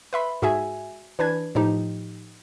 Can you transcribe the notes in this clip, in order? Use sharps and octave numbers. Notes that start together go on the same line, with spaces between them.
B4 E5 B5 C6
G#2 F#4 G#4 E5 G#5
E3 D4 B4 G#6
A2 F3 D#4 G4